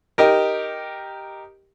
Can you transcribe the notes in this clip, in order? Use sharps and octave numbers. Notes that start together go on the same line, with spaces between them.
D#4 G4 A#4